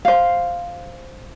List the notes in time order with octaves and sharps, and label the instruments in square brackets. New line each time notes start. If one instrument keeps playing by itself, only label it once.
[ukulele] C5 F5